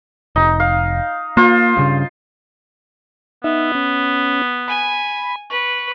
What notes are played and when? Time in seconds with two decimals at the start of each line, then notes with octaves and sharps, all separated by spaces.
0.36 F1 D#4
0.60 F5
1.37 A#3 F4 C5
1.77 G2 C#3
3.44 B3 D#4 E5
3.75 C#4
4.68 G#5 B5
5.50 B4 C#6